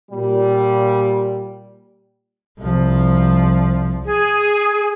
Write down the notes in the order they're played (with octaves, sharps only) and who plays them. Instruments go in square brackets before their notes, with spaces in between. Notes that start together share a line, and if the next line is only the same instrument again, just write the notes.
[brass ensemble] A#2 G3
[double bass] C2 F3
[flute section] G#4